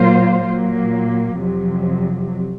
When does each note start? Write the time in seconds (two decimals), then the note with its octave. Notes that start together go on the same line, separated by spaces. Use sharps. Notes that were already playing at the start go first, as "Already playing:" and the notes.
Already playing: A#2 F#3 A#3 F4 C5
0.43 A#2 F#3 A#3
1.39 F2 C3 F#3